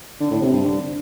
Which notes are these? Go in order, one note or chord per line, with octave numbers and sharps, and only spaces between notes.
D3
A2
C3
G2
D3